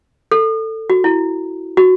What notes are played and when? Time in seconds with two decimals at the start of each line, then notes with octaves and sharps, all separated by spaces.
0.31 A4
0.90 F#4
1.04 E4
1.77 F#4